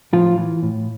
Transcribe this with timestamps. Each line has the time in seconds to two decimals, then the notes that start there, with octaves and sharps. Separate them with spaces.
0.13 A2 F3 F4
0.38 E3
0.62 A2